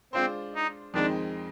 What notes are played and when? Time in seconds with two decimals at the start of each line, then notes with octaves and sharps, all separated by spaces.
0.13 G#3 C4 D4 F4 C5
0.55 D#4
0.94 F2 D#3 G#3 C4 D4 D#4